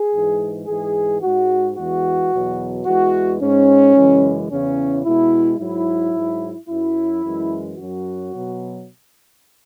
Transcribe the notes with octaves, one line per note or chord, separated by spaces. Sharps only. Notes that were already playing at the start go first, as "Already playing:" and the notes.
Already playing: G#4
G#2 E3 G#3
G#2 E3 G#3 G#4
G#2 G#3 F#4
E2 E3 G#3 F#4
E2 B2 F#3
E2 E3 G#3 F#4
G#2 G#3 C#4
F#2 C#3 E3 G#3
E2 C#3 E3 C#4
B2 G#3 E4
G#2 F#3 E4
G#2 F#3
F#2 F#3 E4
F#2 E3 G#3
F#2 F#3 F#4
B2 F#3